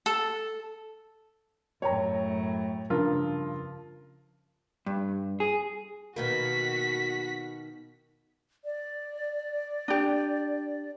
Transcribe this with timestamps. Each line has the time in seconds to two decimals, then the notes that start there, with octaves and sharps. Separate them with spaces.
0.06 A4
1.82 F#2 A2 C#5 G5 A#5
2.90 G2 C#3 F3 F4 A#4
4.86 G2
5.40 G#4
6.16 B2 D#3 A#3 F#4 B6
8.65 D5
9.88 D4 G4